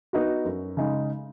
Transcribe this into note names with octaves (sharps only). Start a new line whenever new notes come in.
B3 D#4 F#4
F#2
C#3 G#3 D#4